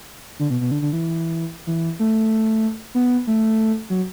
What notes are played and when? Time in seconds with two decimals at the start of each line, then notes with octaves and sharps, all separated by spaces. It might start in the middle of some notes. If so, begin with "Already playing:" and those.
0.39 D3
0.50 B2
0.61 B2
0.71 D3
0.82 D3
0.93 E3
1.67 E3
1.99 A3
2.95 B3
3.27 A3
3.90 F#3